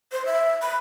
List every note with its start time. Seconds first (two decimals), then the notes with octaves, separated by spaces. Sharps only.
0.12 C5
0.26 E5
0.62 B5